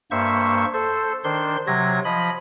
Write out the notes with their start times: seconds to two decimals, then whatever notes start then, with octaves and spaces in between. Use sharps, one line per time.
0.11 G2 A#3 C5 E5 C#6
0.73 A4 C5
1.24 D#3 D4 C5 C6
1.67 C3 F#3 G#6 A#6
2.05 F3 D#5 B5